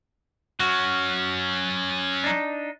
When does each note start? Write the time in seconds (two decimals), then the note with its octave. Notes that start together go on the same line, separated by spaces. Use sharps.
0.60 F#3 C#4 F#4
2.24 D4 D#4